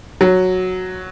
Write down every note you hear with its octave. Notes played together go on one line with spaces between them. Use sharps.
F#3